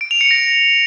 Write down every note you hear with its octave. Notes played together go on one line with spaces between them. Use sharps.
D7
F7
C#7
A#6